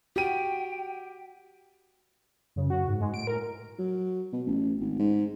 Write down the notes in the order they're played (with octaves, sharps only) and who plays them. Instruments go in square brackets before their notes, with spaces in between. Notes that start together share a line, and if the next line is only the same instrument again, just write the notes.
[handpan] F#4 [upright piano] G4 D#7 [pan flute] G5
[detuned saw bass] F#2 [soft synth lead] C#3
[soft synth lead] F#4
[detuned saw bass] G#2
[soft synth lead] G#3
[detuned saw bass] A2 [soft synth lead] D7
[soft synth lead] A#4
[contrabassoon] F#3
B2
A1
G#1
G#2